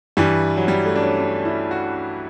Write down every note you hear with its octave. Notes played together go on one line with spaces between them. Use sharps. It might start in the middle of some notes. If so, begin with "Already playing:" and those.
G2 E3 G3
F#3
G3
A3
D4
C#4
D4
E4
F#4